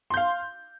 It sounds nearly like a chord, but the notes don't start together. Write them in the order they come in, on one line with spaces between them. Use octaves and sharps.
C6 G6 F5